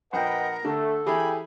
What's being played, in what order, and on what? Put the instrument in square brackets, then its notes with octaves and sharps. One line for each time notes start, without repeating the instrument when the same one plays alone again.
[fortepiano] A#1 [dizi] A#4 [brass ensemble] B4 D#5 G5 [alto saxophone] F#5
[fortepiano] D3 [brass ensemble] A3 [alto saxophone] A4
[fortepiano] E3 G4 G#4 [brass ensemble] G5 G#5 [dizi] B5